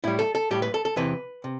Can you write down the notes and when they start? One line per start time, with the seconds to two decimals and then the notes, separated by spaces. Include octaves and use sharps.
0.04 A2 G3 E4
0.19 A4
0.35 A4
0.51 A2 G3 G4
0.62 B4
0.74 A4
0.85 A4
0.96 E2 C3 E3 B4
1.44 C3